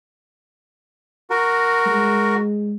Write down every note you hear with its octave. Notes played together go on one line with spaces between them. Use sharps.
F#4 A#4
G#3